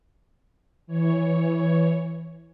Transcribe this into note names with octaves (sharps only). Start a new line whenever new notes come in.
E3 C#5